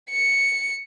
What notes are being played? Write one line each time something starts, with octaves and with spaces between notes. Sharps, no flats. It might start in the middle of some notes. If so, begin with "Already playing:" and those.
C#7